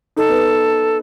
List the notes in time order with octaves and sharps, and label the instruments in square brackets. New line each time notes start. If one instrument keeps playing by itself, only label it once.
[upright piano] D#4 [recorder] A4
[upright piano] B3